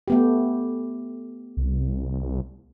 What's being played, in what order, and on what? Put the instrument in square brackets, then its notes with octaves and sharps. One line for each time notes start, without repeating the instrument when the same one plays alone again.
[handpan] A3 B3 G4
[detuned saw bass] C2